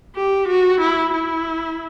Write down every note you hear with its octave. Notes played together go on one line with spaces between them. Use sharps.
G4
F#4
E4
E4